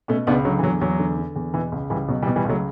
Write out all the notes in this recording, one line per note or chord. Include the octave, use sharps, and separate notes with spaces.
B2 A3 C#4
C#2 B3 D4
D3 F#3
E3
E2 F#3
E2 F#3
D3
D3
E2
B2 E3
C#2
C#2 E3 G3
B2 F#3
E3 G3
B2
E3 G3
C#2 F#3 A3